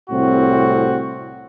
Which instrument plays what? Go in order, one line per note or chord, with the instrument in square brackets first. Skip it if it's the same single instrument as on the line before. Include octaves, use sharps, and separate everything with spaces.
[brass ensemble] C2 A2 C4 F#4